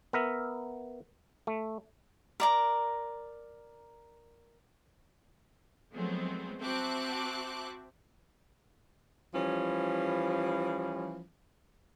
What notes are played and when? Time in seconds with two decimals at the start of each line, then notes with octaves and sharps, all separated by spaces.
0.13 B3 A#4 E5
1.47 A3
2.40 A#4 D5 A#5
5.92 F3 F#3 G#3 A3 B3 C4
6.60 C4 F#4 E5 A5 D6 F#6
9.34 E3 F3 G3 C#4